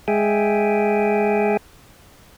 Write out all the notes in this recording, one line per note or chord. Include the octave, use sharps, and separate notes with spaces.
G#3 G#4 E5 G5 G#5